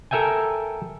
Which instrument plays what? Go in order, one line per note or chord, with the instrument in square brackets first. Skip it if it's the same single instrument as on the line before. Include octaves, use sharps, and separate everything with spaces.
[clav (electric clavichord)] A4 A#4 E5 G5 G#5